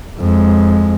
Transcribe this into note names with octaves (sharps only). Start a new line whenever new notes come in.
F2 G#3